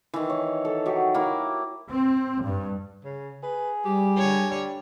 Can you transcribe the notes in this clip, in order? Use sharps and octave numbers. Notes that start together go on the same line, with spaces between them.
D#3 E3
C#5
A4
F#3 D#4 G4
A#3 E4
C4
G2
C#3
G#4 B4
G3 G4
D3 C#5
G3